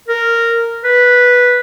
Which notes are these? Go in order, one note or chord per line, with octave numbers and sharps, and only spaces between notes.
A#4
B4